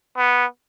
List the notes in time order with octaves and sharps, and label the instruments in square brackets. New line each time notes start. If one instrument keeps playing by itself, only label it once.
[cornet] B3